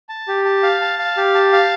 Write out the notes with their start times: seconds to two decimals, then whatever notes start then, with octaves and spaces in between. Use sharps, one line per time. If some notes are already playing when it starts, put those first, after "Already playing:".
0.09 A5
0.28 G4
0.45 A5
0.63 F5
0.81 A5
0.99 F5
1.17 G4
1.35 A5
1.53 F5